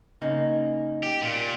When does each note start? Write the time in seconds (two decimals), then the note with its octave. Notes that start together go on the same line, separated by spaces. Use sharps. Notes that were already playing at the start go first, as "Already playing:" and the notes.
0.22 C#3 A#3 D#4
1.03 G4
1.22 A#2